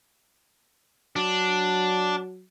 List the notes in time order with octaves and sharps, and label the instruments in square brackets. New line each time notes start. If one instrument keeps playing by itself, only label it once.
[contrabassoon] F#3 [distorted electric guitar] D4